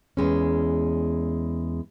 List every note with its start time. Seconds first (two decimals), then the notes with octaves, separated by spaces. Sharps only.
0.17 E2 G#3 C#4